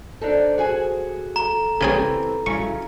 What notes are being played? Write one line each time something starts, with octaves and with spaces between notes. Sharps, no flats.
D4 D#4 A4 C5
F#4 G#4 G#5
A4 A#5
C#3 E3 C4 C#4 G4 G#4
C#3 F#3 E4 C#6